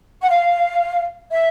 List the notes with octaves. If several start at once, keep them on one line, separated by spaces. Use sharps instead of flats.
F#5
F5
E5